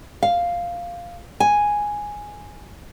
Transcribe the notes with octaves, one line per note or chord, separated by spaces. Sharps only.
F5
G#5